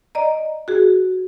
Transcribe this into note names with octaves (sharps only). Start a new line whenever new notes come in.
D5 D#5 A#5
F#4 G#4